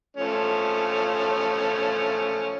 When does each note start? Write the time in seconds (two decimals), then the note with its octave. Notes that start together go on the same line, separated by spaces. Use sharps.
0.17 F3 A3 C#4